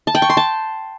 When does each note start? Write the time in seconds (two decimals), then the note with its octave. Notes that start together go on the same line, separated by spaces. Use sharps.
0.07 A5
0.15 G5
0.22 C#6
0.30 C6
0.37 A5